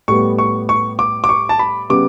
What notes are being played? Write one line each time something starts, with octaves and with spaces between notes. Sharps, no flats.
A2 G3 B3 C#6
C#6
C#6
D6
D6
C#6
A5
B5
C#3 G3 B3 D6